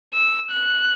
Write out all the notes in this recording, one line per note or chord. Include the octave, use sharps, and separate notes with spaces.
E6
F#6